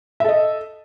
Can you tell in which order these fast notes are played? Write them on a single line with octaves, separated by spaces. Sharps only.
E5 A4 D#5